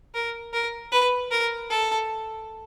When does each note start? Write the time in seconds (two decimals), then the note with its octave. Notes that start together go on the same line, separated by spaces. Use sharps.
0.14 A#4
0.53 A#4
0.92 B4
1.31 A#4
1.70 A4